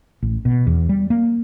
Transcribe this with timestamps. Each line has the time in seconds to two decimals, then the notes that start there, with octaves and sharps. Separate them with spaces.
0.22 A1
0.45 B2
0.67 E2
0.89 G3
1.10 A#3